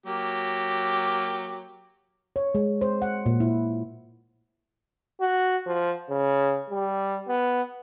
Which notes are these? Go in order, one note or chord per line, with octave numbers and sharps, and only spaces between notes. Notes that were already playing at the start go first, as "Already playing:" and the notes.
F#3 A#3 G4
C#5
G#3
C5
F#5
A#2
E4
F#4
F3
C#3
G3
B3